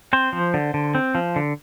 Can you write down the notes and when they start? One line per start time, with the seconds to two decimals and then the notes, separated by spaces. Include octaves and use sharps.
0.13 C4 C5
0.33 F3
0.54 D3
0.74 D3
0.95 C4
1.15 F3
1.36 D3